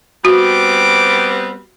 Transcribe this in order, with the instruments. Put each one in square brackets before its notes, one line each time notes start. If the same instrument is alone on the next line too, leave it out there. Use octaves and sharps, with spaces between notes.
[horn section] G3 B3 C4 [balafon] F#4 [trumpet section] D6